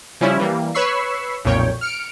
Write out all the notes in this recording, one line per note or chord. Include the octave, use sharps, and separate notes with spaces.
C#3 F3 G3 C#4 E4
E3 G3 A#3
B4 C#5 B5 C#6 E6 C7
B1 F2 A#2 C#5 G5
F6 C#7 D7